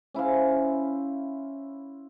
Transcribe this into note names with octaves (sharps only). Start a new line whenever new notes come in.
C#4 E4 C5 F5